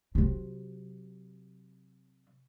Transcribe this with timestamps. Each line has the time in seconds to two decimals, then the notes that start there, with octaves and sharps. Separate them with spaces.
0.15 C3 F#3